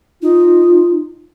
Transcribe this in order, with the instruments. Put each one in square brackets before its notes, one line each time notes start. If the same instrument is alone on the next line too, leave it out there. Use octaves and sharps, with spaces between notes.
[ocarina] D#4 [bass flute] F4